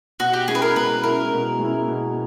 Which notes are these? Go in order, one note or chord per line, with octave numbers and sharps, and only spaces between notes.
B2 F#4
G4
G#3 C#4 E4 G#4
B4
A#4
B2 B4
G#3 C#4 E4 A#4
B2
G#3 C#4 E4
B2